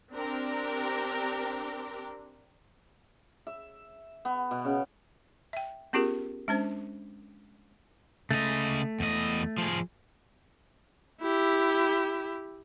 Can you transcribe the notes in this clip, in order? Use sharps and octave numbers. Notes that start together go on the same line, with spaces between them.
C4 D4 G4 A#4
E5
B3
B2
C#3
E5 G5
B3 C#4 F4 G4 G#4 A#4
G#3 C#4 D4 C5
C#3 A3 D#5
E2 D#5
F3 G#4
E4 G4